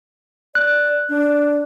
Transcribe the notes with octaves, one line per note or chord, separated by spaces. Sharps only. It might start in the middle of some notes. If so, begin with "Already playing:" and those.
D5 F#6
D4